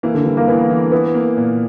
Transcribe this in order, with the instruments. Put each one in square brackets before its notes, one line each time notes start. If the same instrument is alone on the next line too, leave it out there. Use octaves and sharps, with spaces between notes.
[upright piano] E3 [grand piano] A#3
[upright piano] D3
[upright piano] E3 [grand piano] G3
[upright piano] A#3
[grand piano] E3 [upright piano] B3
[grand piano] E3
[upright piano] B3 [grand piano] E4
[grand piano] A#3
A#2